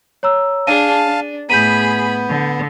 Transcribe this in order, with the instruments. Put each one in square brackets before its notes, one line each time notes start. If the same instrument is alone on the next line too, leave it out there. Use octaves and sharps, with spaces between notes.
[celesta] C#5 A#5 E6
[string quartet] D4 G#4 [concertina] F5 A5 [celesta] D#7
[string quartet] D4
[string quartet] A2 G#4 B5 [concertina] B3 [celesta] G6 B6 D#7
[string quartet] D3